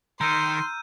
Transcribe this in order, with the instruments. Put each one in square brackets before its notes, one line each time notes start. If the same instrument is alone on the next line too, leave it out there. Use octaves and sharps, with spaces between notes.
[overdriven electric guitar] D#3 [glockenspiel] A#5 E6 F6 [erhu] C6 [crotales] G6 D#7